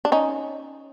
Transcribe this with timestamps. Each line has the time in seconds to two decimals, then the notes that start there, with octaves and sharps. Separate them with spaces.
0.05 D4
0.12 C#4 D#4